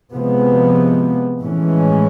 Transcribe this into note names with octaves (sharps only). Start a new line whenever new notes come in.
C3 F3 G#3 B3
A2 E3 G#3 C#4